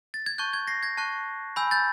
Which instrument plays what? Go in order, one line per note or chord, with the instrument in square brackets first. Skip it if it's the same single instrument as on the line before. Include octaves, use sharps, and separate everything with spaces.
[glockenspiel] A6
G#6
A5 C#6 F#6 G6
G#6
A#6 C7
G#6 A#6
A5 C#6 F#6
G#5 B5 E6 G6
G6 A6